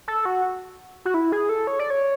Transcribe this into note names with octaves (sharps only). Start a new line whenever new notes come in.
A4
F#4
F#4
E4
G#4
A4
C#5
D5
C#5